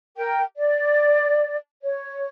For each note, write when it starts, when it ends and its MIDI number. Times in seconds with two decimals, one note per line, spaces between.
0.17 0.42 70
0.17 0.42 79
0.58 1.56 74
1.82 2.29 73